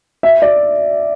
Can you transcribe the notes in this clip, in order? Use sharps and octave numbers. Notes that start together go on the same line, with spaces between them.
E5
D5